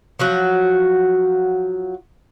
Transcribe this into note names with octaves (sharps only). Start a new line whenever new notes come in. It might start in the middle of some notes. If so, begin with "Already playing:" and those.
F3 F#3 F#4